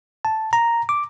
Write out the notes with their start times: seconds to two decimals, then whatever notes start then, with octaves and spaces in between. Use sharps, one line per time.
0.25 A5
0.53 A#5
0.89 D6